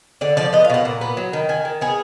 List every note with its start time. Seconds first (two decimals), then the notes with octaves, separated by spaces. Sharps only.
0.21 D3 D5
0.37 F3 D5
0.53 B3 D#5
0.64 F5
0.70 B2 F#5
0.85 A#2
1.01 B3
1.17 F#3
1.33 D#3
1.49 D#3 G#5
1.65 D#3
1.81 B3 G#4